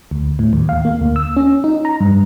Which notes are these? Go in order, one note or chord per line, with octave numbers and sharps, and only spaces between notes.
D2
A2
D#2
F5
A#3
D2
E6
C#4
D#4
A#5
G2